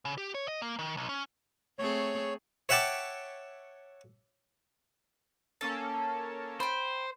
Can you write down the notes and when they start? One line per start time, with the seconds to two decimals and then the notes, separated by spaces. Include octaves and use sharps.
0.05 C#3
0.18 G4
0.34 C#5
0.48 D#5
0.62 A#3
0.79 D#3
0.97 B1
1.09 C#4
1.79 A3 C4 G#4 C#5
2.69 C#5 E5 F#5 G5 A5 D6
5.61 A#3 C#4 A4 A5
6.60 C5 G5 B5